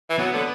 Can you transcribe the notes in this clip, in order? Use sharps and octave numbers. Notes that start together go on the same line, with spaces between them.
E3
F#3 B3
D3
B3